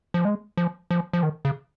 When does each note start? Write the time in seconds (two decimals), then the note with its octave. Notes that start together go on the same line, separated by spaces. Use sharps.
0.14 F3
0.25 G#3
0.57 F3
0.90 F3
1.13 F3
1.23 D#3
1.45 C#3